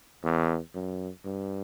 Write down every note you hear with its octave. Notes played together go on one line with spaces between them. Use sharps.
E2
F#2
G2